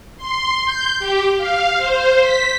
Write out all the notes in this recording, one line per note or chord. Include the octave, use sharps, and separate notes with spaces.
C6
G6
G4
F5
C5
B6